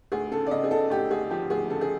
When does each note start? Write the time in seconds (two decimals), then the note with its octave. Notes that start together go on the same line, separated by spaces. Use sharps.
0.12 D2 G#4
0.31 C#3 A4
0.47 D5
0.51 C#3 D#5
0.64 G#4
0.71 C#3 A4
0.90 D2 G4
1.11 D2 G#4
1.30 F3 G4
1.50 D2 G#4
1.69 C#3 A4
1.81 G#4